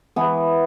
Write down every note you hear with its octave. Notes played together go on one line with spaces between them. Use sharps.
E3 B3